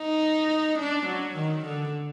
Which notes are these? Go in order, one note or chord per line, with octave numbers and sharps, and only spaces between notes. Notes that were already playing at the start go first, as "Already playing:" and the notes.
Already playing: D#4
D4
F#3
D#3
D3